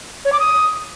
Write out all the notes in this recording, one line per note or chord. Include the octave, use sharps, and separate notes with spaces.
C#5
D6
D#6